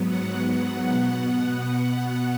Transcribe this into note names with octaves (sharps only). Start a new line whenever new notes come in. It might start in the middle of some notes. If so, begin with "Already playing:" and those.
Already playing: G#2 F#3 B3
F#5
B2 B3
F#5